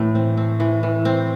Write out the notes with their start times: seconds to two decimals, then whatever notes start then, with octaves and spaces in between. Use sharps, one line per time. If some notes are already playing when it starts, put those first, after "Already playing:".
Already playing: A2 E3 A3
0.15 C4
0.37 C4
0.60 E3
0.83 E3
1.05 C4